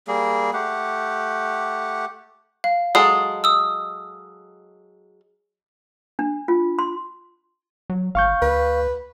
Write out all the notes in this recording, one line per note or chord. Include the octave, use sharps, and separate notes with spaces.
G3 A#3 G#4
A3 G4 F#5
F5
F#3 G#3 A4 D#6 C7
D#6 E6
D4
F4
C6
F#3
G#1 F5 C#6 G6
D2 B4